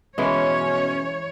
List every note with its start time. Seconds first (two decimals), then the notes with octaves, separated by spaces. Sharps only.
0.18 B2 E3 G#3 C#4 C#5